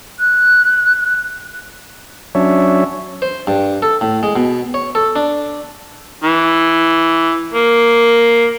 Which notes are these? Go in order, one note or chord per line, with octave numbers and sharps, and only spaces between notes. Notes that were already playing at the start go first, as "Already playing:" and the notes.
F#6
F#3 C#4 D4 C#5 E5
C5
G2
A4
A2
G#3
B2
C#5
A4
D4
E3
A#3